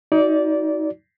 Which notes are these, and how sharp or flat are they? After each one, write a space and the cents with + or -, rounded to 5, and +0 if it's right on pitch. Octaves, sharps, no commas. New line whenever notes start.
D#4 +25 F#4 +0 D5 -15